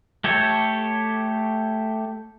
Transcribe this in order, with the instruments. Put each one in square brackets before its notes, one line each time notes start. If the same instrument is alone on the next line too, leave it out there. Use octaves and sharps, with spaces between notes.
[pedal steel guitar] A3 G4 A4 C#5